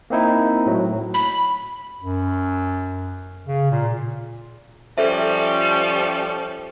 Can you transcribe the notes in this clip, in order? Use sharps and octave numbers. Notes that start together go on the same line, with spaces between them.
A#3 C4 D#4 E4
A2 F#3
B5
F#2
C#3
A#2
F3 G3 C#4 A4 C5 E5